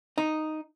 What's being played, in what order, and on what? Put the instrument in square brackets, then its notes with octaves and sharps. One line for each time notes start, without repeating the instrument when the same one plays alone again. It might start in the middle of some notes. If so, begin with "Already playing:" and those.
[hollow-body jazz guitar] D#4